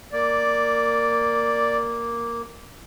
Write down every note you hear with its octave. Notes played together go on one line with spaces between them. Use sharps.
A#3 D5